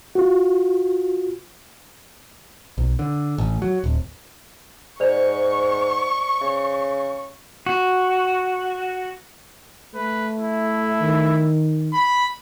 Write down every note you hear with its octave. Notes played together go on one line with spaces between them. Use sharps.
F4 F#4
B1
D3
A1
F#3
D1
G#2 C5 D5 C#6 F7
C#3
F#4
A3 B4
E4
D#3
B5